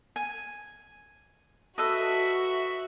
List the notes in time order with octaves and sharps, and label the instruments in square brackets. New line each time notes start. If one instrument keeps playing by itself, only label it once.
[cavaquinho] G#5
[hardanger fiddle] F#4 E5 [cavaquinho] A4 B4 D#5